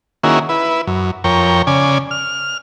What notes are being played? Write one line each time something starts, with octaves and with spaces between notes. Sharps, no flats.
D#3 A#3 C#4 E4 F#4 G#4
E4 B4
F#2
F2 A#4 C#5 G5
C#3 D5 G#5
F6